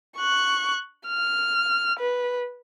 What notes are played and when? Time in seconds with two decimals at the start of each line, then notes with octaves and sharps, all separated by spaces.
0.17 C#6 F#6
1.07 F6
1.99 B4